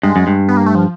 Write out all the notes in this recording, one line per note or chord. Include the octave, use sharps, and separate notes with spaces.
G2 G#3
F#2
G2
B3
A#3
A3
F3